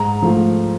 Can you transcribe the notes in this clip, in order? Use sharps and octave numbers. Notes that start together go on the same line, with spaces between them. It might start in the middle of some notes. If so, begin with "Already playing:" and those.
Already playing: G#2 A#5
F3 A3